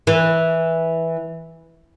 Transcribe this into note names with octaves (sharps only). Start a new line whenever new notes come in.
E3